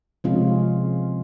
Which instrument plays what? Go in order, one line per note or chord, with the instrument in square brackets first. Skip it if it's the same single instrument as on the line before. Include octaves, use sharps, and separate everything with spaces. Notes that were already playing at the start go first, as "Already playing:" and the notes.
[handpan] C3 F3 G#3 C#4 F4